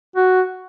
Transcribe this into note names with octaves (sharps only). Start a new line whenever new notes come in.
F#4